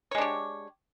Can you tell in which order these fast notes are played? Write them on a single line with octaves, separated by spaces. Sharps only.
C#5 G#3 D4 G4